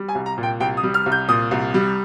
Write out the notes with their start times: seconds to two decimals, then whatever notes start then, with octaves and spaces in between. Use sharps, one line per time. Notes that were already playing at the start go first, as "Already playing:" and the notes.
Already playing: G3
0.08 G#5
0.15 C2
0.26 A#5
0.38 A#2
0.43 G5
0.60 C2 G5
0.77 D#6
0.83 G3
0.94 F6
1.06 C2
1.12 G6
1.28 A#2 D#6
1.51 C2
1.74 G3